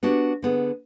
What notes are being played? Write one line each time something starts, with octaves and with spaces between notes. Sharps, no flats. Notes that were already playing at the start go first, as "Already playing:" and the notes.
B3 D4 F#4 G4
D3 B3 G#4